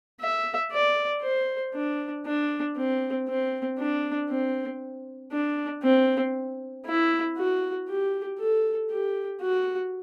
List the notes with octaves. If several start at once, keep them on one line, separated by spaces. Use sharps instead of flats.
E5
D5
C5
D4
D4
C4
C4
D4
C4
D4
C4
E4
F#4
G4
A4
G4
F#4